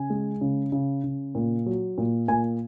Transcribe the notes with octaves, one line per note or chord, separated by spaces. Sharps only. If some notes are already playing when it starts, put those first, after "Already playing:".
Already playing: C#3 G#5
G#3
C#3
C#3
C#3
A#2
F#3
A#2
A#2 G#5